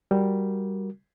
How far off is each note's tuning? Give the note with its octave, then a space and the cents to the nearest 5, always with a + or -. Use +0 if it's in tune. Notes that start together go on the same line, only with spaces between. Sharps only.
G3 +0 F#4 +0 A#4 +0